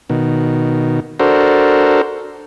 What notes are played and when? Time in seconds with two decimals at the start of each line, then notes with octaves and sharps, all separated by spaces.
0.10 B2 D#3
1.20 D4 F#4 A4 A#4 C5